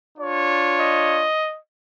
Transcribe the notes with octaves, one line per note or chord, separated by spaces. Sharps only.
D4 F4 C#5
D#5